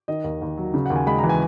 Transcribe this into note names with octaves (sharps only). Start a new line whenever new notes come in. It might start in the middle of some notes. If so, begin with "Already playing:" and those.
D#3 D#5
D#2
D#2
F#3
C#3
D#2 F#5
G#5
G#3 B5
E3 A#5
G#5